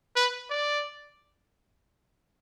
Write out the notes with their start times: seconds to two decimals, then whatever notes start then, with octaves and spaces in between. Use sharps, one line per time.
0.16 B4
0.50 D5